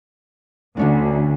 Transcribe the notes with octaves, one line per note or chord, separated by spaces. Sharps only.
D2 D3 C#4 D4